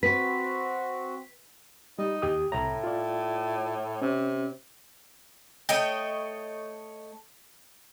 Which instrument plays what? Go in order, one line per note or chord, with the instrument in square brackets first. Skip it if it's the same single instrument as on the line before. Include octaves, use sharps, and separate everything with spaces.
[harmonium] C4 F#4 [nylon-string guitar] B4 [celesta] B6
[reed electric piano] G3 [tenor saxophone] D#4
[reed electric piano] D#2 G4 D#6
[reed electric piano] C2 A#5 [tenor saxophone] A2
[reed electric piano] F4 D5
[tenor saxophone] C3 [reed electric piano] C#4
[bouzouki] A3 C#5 D#5 G5